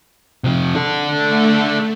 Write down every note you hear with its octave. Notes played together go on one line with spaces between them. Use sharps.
C3 F3
D4 A4
A3